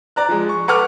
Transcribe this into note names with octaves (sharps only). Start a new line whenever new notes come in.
D5 A#5 F#6
F3 G#3
C#6
A4 B4 F#5 C#6 D6 F6